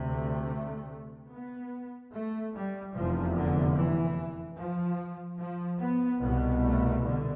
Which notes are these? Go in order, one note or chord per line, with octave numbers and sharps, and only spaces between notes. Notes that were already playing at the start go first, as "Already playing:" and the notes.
Already playing: D2 C3
A3
B3
A3
G3
F1 E2 C3 F3
D3
E3
F3
F3
B3
C2 B2 B3
A3
D3